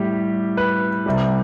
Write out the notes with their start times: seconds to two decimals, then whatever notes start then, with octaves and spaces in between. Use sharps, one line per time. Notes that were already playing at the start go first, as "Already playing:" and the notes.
Already playing: A2 G3 G4
0.57 B4
1.06 C2 C3 G3